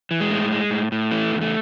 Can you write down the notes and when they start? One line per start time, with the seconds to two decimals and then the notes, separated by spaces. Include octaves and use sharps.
0.11 E3
0.20 G#3
0.30 A2
0.52 G#3
0.71 A2
0.92 A2
1.11 E3 A3
1.31 E2
1.41 A3